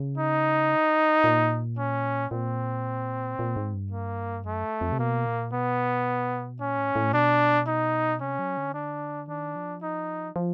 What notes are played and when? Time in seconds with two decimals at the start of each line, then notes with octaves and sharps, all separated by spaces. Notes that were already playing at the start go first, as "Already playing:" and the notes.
Already playing: C#3
0.17 D#4
1.24 A#2
1.78 C#4
2.31 A#2 C4
3.39 A#2
3.56 G#2
3.74 G2
3.92 A#3
4.45 F#2 A3
4.81 F2
4.92 C3
4.99 B2 A#3
5.26 A#2
5.53 B2 B3
6.60 A#2 C#4
6.78 A2
6.95 A2
7.13 B2 D4
7.67 D#4
8.21 C3 C#4
8.39 F#3
8.57 D3
8.74 D4
9.28 D#3 D4
9.56 F3
9.82 D#4
10.36 F3